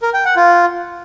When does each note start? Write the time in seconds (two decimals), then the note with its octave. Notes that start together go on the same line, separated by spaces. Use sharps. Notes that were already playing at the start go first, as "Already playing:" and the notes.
0.02 A#4
0.14 G5
0.25 F#5
0.36 F4